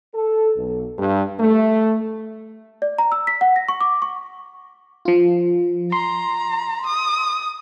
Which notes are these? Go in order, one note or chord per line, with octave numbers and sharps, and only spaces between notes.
A4
B1
G2
A3
D5
A#5
E6
B6
F#5
A#6
C#6
D6
C#6
F3 F4
A#5 C6
D#6